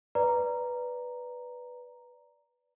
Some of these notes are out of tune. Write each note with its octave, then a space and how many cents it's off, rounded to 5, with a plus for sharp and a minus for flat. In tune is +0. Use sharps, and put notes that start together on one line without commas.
B4 +0 D5 -10 A#5 +0